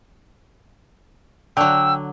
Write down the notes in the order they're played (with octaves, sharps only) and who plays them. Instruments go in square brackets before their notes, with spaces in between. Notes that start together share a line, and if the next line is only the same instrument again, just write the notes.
[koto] D3 F#3 [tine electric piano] G5 [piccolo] E6